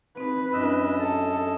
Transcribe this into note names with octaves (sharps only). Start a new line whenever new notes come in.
C4 D#4 B4
F#2 C4 D4 E4 D#5 E6
A4 A#5 A6